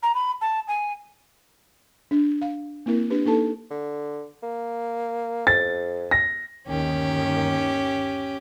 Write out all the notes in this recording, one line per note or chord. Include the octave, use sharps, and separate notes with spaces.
A#5
B5
A5
G#5
D4
F5
A#3 C4 E4 A#4
D4 G4 B4
A#3 D#4 A4 A5
D3
A#3
F2 A6
A#6
G1 D#2 D#3 C#4 G4